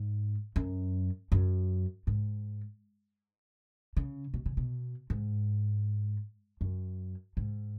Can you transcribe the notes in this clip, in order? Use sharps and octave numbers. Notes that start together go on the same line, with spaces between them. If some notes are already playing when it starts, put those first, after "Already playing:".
Already playing: G#2
F#2
F#2
G#2
C#3
B2
C#3
B2
G#2
F#2
G#2